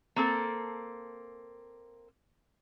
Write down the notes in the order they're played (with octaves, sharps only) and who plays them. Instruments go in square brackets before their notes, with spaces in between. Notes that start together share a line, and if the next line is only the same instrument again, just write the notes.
[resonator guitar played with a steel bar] A#3 C4 A4